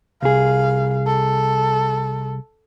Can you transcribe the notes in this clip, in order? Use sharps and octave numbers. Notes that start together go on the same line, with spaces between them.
C2 G#4 F5
A4